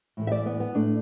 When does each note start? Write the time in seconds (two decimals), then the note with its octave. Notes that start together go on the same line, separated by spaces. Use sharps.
0.17 A2 E3 A3
0.27 E5
0.32 D5
0.46 B3
0.60 B3
0.74 A2 A3 D4